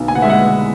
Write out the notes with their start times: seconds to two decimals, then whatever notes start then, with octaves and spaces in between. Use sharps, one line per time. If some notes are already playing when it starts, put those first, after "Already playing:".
Already playing: B1 B2
0.08 G#5
0.15 F#5
0.22 G#3 E5
0.30 F#5